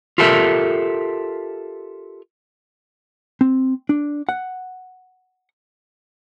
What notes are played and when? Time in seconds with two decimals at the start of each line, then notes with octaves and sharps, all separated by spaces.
0.18 F4 G4 A4 A#4 E5
3.41 C4
3.89 D4
4.29 F#5